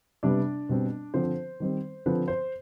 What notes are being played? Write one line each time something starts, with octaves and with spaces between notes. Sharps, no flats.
C3 G3 B3 D4 D5
B2 G3 C4
D3 F3 C4 C5
D#3 G3 C4
D3 F3 C4 B4
C5